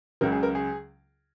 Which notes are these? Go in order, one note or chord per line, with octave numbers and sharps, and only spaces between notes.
C#2 C#3 F#3 A#4
G#4
A#4
G#4